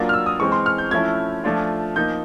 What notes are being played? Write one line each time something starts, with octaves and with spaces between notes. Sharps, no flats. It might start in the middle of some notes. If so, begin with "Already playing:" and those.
Already playing: F#3 A#3 D4 F4
F6
E6
D#6
E3 G#3 C4 C#6
C6
F6
G6
F3 A3 C#4 E4 G#6
F3 A3 D4 F4
F3 A#3 D#4 G6